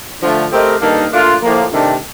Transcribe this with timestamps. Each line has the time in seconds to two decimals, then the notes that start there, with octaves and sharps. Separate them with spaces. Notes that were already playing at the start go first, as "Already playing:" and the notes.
0.22 D3 F3 A3
0.51 A3 C4 G4 A#4 D#5
0.81 G2 D#3 A#3 D#4 A4
1.12 A#2 A3 D4 F4
1.41 A2 F3 A#3
1.71 C3 D#3 A3 D4 G4